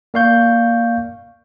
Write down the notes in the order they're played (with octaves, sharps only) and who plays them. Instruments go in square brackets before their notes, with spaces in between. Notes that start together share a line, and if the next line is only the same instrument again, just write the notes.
[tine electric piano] A#3 D5 F5 C#6 G6